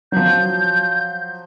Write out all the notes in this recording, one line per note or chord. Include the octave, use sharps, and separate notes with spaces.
F3 F#3 G6